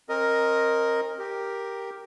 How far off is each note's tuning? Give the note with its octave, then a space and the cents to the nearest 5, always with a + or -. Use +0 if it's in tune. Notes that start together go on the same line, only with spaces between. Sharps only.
C4 +40 A#4 +0 D#5 +0
G4 +0 A#4 +0